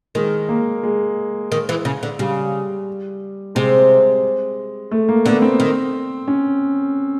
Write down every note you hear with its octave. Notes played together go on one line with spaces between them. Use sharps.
D#3 G#3
A#3
G#3
D#3
E3
C#3
D3
C#3 G3
C3 G#3
A3
A#3
D3 B3
C4
D#3
C#4